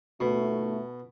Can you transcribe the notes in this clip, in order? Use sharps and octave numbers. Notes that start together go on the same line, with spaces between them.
G1 D#2 B2 A3